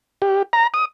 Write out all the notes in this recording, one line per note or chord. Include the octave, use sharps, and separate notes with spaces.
G4
A#5
D#6